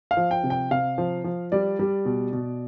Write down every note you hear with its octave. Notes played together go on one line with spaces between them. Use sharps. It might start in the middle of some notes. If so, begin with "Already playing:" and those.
F5
F3
G5
C3
G5
C3 F5
F3
F3
G3 D5
G3
B2
B2